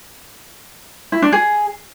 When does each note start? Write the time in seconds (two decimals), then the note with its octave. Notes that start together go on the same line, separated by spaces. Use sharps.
1.12 E4
1.22 D4
1.32 G#4